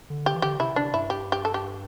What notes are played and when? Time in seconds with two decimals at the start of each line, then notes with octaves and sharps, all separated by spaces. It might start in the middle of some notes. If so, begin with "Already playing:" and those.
0.10 D3
0.26 G4
0.34 E3
0.42 D3 G4
0.60 C3 E4
0.76 C3 D4
0.94 G2 E4
1.10 G4
1.32 G4
1.45 A4
1.54 G4